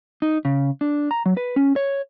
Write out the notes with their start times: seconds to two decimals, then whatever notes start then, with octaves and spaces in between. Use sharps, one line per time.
0.22 D#4
0.45 C#3
0.81 D4
1.11 A#5
1.26 F#3
1.37 B4
1.56 C#4
1.76 C#5